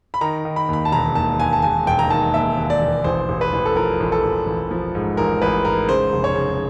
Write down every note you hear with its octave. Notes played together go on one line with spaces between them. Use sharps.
B5
D#3 A#5
D#3
B5
D#2 B5
A5
E1 A#5
D#2 A5
D#2 G#5
A5
E1 G#5
E1 G5
A#5
D#3 A5
D#2 E5
D#2
D5
E1
A1 C5
A1
B4
A1
A4
F3 A#4
A1
A4
A1
A1
F3
G#2
A1 A#4
A1 B4
G#2 A#4
C#3 C5
F1
C#5
C#3